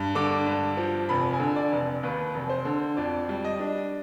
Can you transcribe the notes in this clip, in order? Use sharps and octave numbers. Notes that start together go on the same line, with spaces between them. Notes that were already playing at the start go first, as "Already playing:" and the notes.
Already playing: G2
D3 D6
G2
F3
F1 B5
G#5
D3
D5
F1
D#2 B4
F1
C5
D3
F2 D5
G3
D#5
D4